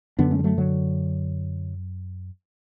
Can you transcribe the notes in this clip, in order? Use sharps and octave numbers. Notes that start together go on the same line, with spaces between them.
F#2 D3 B3 D4
A3 C#4
G3
F#3 A3
D3 F#3